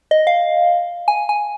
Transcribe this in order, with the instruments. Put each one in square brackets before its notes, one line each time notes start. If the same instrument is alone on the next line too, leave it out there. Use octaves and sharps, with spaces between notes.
[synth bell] D#5
F5
G#5
G#5